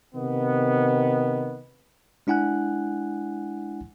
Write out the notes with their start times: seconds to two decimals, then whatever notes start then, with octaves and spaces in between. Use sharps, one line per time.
0.15 C3 D#3 B3
2.27 G#3 D4 E4 F#5 G#5 F#6